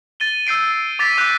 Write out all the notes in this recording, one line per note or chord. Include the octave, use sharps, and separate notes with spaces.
A6 D#7 G7
E6 G6 C7 D7
D6 A6 B6 D#7
D6 F#6 G6 B6